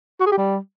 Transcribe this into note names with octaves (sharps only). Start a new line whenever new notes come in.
F#4
G#4
G4
G3